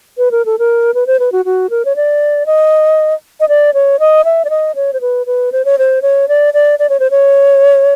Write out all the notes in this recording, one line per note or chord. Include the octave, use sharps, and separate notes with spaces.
B4
A#4
A4
A#4
B4
C5
B4
F#4
F#4
A#4
C#5
D5
D#5
D#5
D5
C#5
D#5
E5
D5
D#5
C#5
C5
B4
B4
C5
C#5
C5
C#5
D5
D5
D5
C#5
C5
C#5